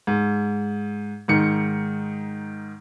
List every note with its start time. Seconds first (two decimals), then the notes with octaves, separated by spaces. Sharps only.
0.07 G#2
1.28 G#2 D#3 C#7